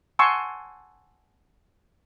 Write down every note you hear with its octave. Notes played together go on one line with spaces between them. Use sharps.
F#5 G#5 A5 C6 C#6 E6